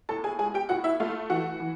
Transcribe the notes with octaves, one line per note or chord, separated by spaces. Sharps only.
A2 A4 A5
G#4 G#5
G#3 G#4 G#5
G4 G5
A2 F#4 F#5
E4 E5
A3 F4 F5
E3 F#4 F#5
E3